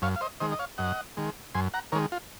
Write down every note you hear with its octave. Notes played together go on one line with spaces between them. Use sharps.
F#2 C#5 F5
F5
C5 D#5
D#3 G#3 C5 D#5
D#5
C#5 F5
F#2 D#5 F#5
D#3 G#3
F#2 G#5 C6
F#5 A#5
D#3 G#3 A#4 C#5
F4